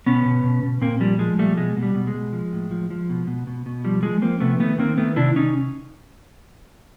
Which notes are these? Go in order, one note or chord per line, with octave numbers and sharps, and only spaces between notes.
B2 B3 C#4
B2
B2
B2
A#2 A#3 C4
F3 G3
F3 G#3
A#2 G3 A3
B2 G#3
B2
G3
B2
G#3
B2
F3
A2
F3
F3
B2
B2
B2
B2
F3 G3
F3 G#3
F3 A#3 C4
C3 A3 B3
D#3 A3 B3
D#3 A#3 C4
D#3 A3 B3
C3 D4 E4
C3 C#4 D#4